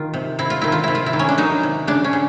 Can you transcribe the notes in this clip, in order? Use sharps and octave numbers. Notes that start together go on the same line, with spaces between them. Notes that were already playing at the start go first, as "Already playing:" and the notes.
Already playing: D#3 F4
C3
C3 E4
F4
D#3 E4
F4
C3 E4
F4
E4
D#3
C#4
D4
F#3 D#4
C3
C#3 D4
C#4
C#3